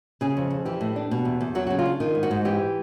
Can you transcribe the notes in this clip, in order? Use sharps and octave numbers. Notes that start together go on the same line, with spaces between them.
C#3 G#4
F2
F2
E3 G4
A2
D4
B2
E2
E2
F#3 F#4
C#3 F#4
F4
D4
D#3 F4
G#2
F#4
G#2
E3 G4